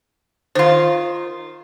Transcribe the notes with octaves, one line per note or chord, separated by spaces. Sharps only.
D#3 F4 C5